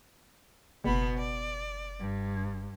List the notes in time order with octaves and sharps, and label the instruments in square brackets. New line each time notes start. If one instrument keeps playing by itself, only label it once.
[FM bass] F#1 [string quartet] B2 B3 B5
[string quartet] D5
G2